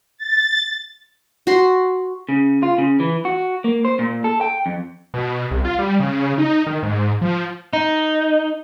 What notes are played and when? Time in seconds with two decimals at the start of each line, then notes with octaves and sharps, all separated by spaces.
0.18 A6
1.47 F#4 C6
2.29 C#3
2.63 F4
2.78 C#3
3.00 E3
3.25 F#4
3.64 A#3
3.85 C5
3.99 A#2
4.24 A4
4.41 G5
4.66 F2
5.14 B2
5.51 C2
5.65 F4
5.79 G3
6.00 C#3
6.38 D#4
6.67 D#3
6.83 G#2
7.21 F3
7.73 D#4